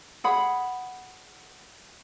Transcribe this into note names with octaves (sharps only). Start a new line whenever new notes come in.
G#4 F#5 B5